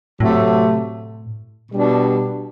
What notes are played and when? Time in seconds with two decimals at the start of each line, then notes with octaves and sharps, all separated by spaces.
0.20 A2 C3 F#3 A3
1.72 B2 G3 D4